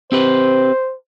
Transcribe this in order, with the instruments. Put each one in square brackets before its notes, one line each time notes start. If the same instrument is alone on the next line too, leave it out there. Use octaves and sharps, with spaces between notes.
[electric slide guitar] C4 G4 B4 [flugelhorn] C5